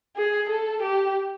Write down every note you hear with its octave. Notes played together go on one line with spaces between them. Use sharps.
G#4
A4
G4